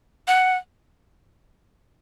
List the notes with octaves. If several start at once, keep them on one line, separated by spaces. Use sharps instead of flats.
F#5